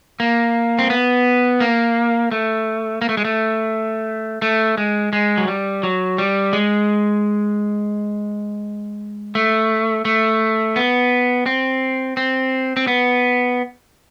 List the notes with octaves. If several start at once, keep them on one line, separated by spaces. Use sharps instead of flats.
A#3
C4
B3
A#3
A3
A#3
A3
G#3
A3
A3
G#3
G#3
F#3
G3
F#3
G3
G#3
A3
A3
B3
C4
C4
C4
B3